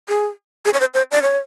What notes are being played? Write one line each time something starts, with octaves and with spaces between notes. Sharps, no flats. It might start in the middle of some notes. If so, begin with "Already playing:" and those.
G#4
G#4
C#5
C5
C5
D5
C#5